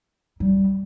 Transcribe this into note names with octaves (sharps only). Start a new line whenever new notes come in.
G3